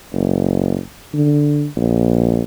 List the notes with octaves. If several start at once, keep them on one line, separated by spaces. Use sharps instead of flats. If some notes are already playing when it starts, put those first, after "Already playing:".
F#1
D3
A#1